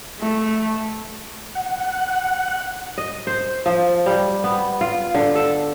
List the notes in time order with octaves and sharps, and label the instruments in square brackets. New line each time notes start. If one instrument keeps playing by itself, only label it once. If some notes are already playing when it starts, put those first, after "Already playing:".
[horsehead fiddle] A3
[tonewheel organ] F#5
[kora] D#5
C5
F3
G3
B3
F4
D3
A4